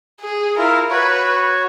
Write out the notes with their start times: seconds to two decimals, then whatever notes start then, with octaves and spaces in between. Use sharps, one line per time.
0.21 G#4
0.57 E4 F4 A#4
0.91 F#4 B4 C#5